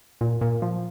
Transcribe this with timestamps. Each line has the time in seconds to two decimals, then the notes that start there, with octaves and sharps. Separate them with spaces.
0.21 A#2
0.41 A#2
0.62 F3